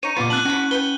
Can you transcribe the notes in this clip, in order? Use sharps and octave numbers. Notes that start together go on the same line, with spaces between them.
D#4 C#5 D#7
A#2 B3 F4 B4 D6
C4 D4 A5 F#6 F#7
C#4 F#4 F#5 A5 B5
B4 F#5 G5 G7